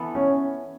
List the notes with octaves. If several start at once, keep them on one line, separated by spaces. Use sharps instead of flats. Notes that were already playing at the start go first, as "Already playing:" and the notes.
Already playing: E3 B3 A4
C#4